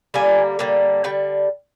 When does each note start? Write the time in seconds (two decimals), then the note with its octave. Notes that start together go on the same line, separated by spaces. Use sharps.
0.14 D3 G3 A#3 G#5
0.59 D3 G3 A#3
1.04 D3 G3 G5